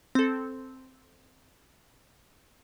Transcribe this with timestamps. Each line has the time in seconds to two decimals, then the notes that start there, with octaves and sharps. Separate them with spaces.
0.15 C4 A4